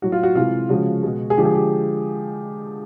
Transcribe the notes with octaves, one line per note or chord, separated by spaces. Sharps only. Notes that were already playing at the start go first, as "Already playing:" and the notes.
A2 F#3 F#4
F4
F#4
C3 E3 G#3 F4
C#3 F3 G#3 F#4
B2 G#3
G#4
D3 F3 G#3 G4
G#4
G4